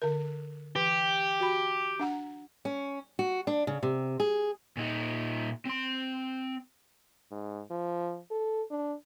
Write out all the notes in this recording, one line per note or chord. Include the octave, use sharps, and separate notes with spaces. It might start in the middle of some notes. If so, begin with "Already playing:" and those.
D3 A#4
E3 G4
F#4 B5
D4 F#5 A#5
C#4
F#4
D4
C#3
C3
G#4
A#2 D#4
C4 C6
G#2
F3
A4
D4